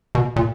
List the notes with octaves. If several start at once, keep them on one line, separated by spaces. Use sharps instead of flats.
B2
A#2